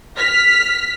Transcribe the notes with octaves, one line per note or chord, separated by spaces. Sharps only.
F6 B6